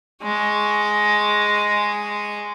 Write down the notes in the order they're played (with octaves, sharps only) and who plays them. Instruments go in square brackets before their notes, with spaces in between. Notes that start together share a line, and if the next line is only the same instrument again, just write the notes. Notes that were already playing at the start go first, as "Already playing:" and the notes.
[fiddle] G#3 C#6